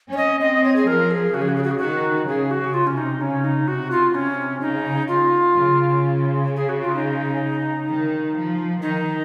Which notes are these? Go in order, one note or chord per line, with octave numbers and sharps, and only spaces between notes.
C#4 C#5
D#5
C4 D#5
C#5
G#4
F3 A#4
G#4
C#3 F#4
G#4
F#4
G#4
F#4
G#4
D#3 F#4
C#3 G#4
F#4
C#3
F4
C3 C#4
D#4
C#3 C#4
D#4
C3 F#4
F4
C3 C#4
C#3 D#4
F4
C#3
G#4
F#4
F4
D#4
D#3
F3
D#3 D#4